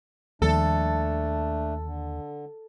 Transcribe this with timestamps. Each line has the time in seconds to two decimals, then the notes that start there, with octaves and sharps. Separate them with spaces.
0.42 D#2 D#3 F3 G3 A3 D4 A4
1.83 D3